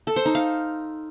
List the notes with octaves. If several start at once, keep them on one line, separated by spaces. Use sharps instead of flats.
A4
C5
D#4
F5